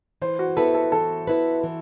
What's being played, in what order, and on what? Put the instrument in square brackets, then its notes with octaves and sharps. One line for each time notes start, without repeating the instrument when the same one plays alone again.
[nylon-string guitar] E3 [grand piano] C5
[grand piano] F#4
[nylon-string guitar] B3 E4 B4 [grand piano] A4
[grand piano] A4
[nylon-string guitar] E3 [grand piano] A4
[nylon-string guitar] B3 E4 B4
E3